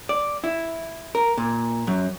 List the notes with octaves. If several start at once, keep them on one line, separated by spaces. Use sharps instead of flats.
D5
E4
A#4
A#2
F#2